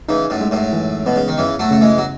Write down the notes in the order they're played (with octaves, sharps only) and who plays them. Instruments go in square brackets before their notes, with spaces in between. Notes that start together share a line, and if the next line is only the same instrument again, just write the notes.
[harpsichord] C#3 E3 [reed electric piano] D#4
[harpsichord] F#2 A2
[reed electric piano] G#3
[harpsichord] F#2 A2
[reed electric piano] E3
[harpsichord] B2 [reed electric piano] B3
[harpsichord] C#3
D#3
[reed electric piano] F#2 [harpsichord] C#3 E3
[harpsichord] F#3 A3
[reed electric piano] C#3 [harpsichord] A3
[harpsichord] E3 G#3
F#3